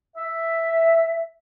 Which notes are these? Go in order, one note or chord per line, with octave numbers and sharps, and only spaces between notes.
E5